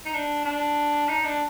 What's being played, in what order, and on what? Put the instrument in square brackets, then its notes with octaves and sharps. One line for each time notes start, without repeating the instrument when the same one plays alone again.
[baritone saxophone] D#4
D4
D4
D#4
D4